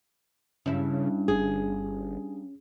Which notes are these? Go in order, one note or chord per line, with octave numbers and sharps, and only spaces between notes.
G2 C#3 C#4 E4
G1 G#4